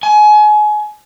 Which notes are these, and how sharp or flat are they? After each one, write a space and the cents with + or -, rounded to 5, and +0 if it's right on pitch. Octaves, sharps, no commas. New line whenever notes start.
G#5 +30